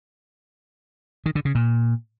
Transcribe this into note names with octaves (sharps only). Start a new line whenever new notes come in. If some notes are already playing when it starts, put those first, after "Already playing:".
D#3
D3
C#3
A#2